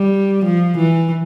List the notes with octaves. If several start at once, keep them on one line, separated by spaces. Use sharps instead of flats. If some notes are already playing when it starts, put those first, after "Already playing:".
Already playing: G3
F3
E3